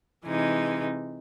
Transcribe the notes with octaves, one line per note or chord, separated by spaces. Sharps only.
C3 E3 G#3 D#4